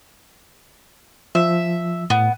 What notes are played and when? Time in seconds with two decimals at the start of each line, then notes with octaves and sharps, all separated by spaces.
1.35 F3 E5
2.10 A2 B3